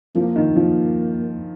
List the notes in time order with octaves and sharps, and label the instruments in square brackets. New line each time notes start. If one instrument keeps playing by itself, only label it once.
[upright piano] F3 [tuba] A#3
[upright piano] D#3
[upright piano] F3 [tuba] A#3